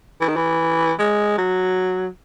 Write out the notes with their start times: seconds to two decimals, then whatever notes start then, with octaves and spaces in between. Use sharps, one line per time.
0.21 E3
0.28 D#3
0.36 E3
0.99 G#3
1.38 F#3